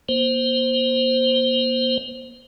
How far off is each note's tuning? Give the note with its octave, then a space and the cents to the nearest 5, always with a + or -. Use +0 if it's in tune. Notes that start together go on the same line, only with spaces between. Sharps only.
A#3 +40 C5 +0